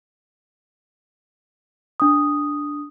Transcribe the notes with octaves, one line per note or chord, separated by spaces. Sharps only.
D4 D#6